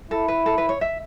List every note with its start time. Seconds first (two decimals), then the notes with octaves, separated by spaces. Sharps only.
0.11 E4 A4
0.28 B4
0.46 A4
0.58 B4
0.69 C#5
0.81 E5